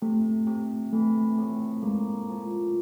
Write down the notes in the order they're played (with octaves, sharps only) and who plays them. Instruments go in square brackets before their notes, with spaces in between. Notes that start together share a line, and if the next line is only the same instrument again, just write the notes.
[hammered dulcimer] C3 [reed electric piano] A3
[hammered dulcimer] C3
[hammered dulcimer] E3 [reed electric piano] A3
[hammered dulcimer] A2
[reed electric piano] G#3 [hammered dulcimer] A#3
[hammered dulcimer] F3